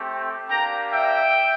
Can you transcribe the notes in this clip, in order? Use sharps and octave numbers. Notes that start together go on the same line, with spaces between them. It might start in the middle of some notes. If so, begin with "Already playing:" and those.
Already playing: A3 C4 G4
A#3 D4 G4 G5 A#5
E5 G5